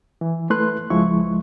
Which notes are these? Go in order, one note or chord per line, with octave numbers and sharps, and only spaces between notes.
E3
A3 E4 B4 C6 F#6
C#2 F3 G#3 E4 C#6